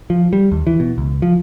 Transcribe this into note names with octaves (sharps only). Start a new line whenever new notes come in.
F3
G3
D#2
E3
B2
C#2
F3